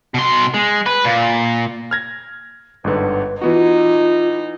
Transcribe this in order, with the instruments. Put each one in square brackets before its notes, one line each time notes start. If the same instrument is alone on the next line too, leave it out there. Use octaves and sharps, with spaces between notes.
[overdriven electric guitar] B2 C6
G#3
B4
A#2
[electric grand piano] F6 G#6 A#6
[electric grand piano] G1 G#2 D3 [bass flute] B4
[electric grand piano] E3 B3 F#4 [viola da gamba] D#4 [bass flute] F4